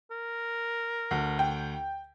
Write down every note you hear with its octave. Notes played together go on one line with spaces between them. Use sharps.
A#4
D2
G5